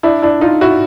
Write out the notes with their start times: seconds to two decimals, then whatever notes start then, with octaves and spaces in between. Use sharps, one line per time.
0.03 D4 E4
0.22 D4 E4
0.41 D#4 F4
0.61 E4 F#4